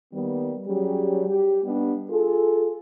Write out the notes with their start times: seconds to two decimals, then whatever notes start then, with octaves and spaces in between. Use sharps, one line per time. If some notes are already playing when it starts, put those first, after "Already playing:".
0.13 D#3 G3 A#3 B3
0.67 F#3 G3 C#4 G4 G#4
1.29 G4
1.64 G3 B3 D4 D#4
2.10 F4 G#4 A4